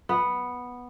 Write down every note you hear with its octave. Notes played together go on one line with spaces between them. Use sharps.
B3